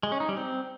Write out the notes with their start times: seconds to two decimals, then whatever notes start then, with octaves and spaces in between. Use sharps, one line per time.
0.03 G#3
0.12 C#4
0.20 D#4
0.29 G3
0.37 C4